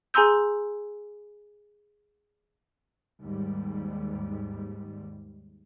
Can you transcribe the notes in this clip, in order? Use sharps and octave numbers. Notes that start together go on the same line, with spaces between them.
G#4 G#5 A#5 C6 E6 G6
D#2 G#2 G3